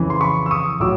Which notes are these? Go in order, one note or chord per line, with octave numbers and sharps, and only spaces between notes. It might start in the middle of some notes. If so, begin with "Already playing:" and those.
Already playing: F2 C#3 E3
C6
B5 C#6
E6
C#6 D#6
A2 F#3 D6 E6